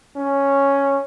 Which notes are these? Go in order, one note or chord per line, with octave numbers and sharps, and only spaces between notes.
C#4